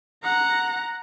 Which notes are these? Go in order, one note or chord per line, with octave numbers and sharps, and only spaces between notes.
F#5 A#5